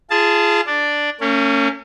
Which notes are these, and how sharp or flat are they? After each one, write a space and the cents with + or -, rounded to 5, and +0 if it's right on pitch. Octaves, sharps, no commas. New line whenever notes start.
F4 -30 G#4 +5 A5 +0
D4 +0 D5 +0
A#3 -45 C#4 +0